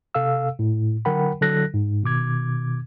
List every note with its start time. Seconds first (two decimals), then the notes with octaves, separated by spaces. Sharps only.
0.15 C3 A4 F5 E6
0.59 A2
1.05 D3 F#3 A#4 F#5 G5 B5
1.41 D3 F#3 A4 F#6 A#6
1.74 G#2
2.03 B2 D#3 D6 G#6